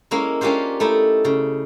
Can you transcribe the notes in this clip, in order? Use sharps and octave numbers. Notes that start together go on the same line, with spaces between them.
G#3 A#3 C#4 E4
A#3 C#4 D4 F4 G4 C5
A3 D#4 E4
C#3